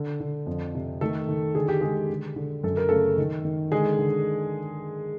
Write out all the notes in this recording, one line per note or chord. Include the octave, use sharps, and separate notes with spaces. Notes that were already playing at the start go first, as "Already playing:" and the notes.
Already playing: D3
D3
F2
C3
D#3 A3 A4
D#3
D3 G#4
G4
D3 G#3 G#4
D3
D3
F#2 A4
A#4
C#3 A3 A4
D#3
D#3
D3 G#3 G#4
D3